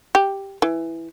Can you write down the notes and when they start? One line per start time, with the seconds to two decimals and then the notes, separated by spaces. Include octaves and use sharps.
0.15 G4
0.62 E3